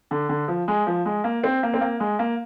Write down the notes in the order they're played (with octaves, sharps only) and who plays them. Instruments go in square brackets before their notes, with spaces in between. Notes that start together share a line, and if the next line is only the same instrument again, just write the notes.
[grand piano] D3
D3
F3
G#3
F3
G#3
A#3
C4
A#3
C4
A#3
G#3
A#3